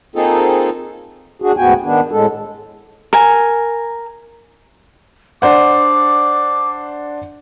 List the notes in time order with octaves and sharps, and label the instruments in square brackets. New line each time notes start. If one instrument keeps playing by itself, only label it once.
[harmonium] A#3 C4 D#4 F4 G#4 A4
D4 F#4 G#4
D2 G#2 B3 F#4 G5 G#5
D#3 B3 D4
A2 G#3 A4
[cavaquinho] A#4 G#5
[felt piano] D4 C5 F#5 [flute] D6